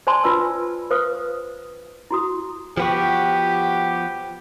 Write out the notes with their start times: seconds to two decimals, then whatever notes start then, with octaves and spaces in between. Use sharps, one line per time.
0.07 C5 D5 G#5 A5 C6
0.24 F4 B4 D5 E6
0.90 B4 C5 F5 D#6
2.11 E4 F#4 D#6
2.77 F3 B3 F#4 G4